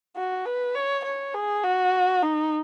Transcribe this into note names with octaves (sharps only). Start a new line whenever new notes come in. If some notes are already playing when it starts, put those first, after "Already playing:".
F#4
B4
C#5
C#5
G#4
F#4
D#4